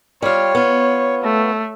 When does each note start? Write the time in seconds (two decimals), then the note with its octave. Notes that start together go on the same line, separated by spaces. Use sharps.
0.22 G3 F4 C#5
0.55 B3 F4
1.24 A3